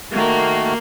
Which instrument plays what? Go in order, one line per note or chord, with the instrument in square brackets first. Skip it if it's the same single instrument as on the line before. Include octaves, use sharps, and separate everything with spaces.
[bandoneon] D#3 A3 F#4 [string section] A#3